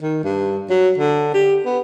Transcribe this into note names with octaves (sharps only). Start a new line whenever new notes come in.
D#3
G2
F#3
D3
G4
B3